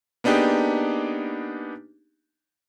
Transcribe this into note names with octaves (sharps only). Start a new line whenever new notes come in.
A#3 B3 D4 D#4 G4 G#4